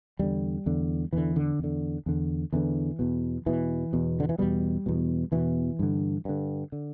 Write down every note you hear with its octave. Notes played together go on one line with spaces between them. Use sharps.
E2 D3 G3
E2 D3
E2 D3 E3
D3
E2 D3
E2 D3
E2 D3 E3
E2 B2
E2 B2 E3
E2 B2
D3
E3
E2 B2 G3
E2 B2
E2 B2 E3
G2 D3
G2 D3
D3